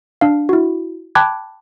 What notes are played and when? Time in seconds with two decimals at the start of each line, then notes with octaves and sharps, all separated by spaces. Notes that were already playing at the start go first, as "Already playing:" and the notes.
0.21 D4 F5
0.49 E4 F#4
1.15 G5 A5 B5 D6 F#6 G#6